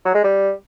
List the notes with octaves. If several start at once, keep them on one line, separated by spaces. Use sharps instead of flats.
F#3
G#3
G3